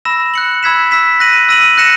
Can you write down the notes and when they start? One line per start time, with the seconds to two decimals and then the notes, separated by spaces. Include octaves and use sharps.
0.05 B5 E6 A#6 E7
0.34 F#6 C#7 F#7
0.63 B5 E6 G#6 B6 E7
0.91 E6 B6 E7
1.20 F#6 A#6 D#7 F#7
1.49 E6 A#6 D#7 F#7
1.78 F#6 A#6 C#7 E7